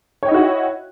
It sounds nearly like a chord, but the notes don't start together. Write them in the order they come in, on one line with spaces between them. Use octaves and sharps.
C#5 G5 D#5 E4 F#4